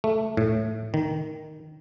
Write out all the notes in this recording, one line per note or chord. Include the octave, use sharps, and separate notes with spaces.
A3
A2
D#3